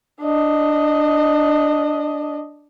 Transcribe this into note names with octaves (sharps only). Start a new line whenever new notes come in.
D4 D#5